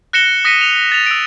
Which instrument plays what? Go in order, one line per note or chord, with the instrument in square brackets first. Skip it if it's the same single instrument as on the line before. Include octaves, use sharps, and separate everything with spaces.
[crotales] F#6 A#6 C#7 E7 G7
D#6 A#6 B6 C#7 D#7
F7
A6 F7
E6 D7